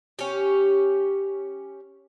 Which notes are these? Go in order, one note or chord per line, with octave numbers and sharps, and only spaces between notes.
C#4 G4